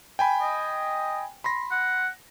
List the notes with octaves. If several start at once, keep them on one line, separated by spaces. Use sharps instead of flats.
G5 G#5 B5
D#5
B5 C6 A#6
F#5